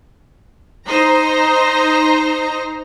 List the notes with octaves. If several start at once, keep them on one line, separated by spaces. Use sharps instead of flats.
D#4 C5 A#5